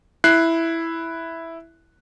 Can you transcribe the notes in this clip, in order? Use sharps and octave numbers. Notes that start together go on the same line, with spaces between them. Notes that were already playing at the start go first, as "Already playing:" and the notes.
E4 F#6 C7